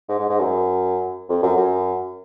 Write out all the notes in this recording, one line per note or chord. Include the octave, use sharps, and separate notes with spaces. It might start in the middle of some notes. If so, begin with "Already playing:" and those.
G#2
G#2
G#2
F#2
F2
F#2
F#2